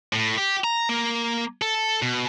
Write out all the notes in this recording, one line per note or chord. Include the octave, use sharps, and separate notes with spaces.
A2
G4
A#5
A#3
A4
B2